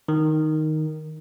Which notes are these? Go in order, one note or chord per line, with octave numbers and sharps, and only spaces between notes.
D#3